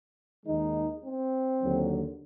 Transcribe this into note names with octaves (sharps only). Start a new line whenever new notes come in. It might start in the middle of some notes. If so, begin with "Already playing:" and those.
D#2 D#3 G#3 D#4
C4
D#2 D3 F#3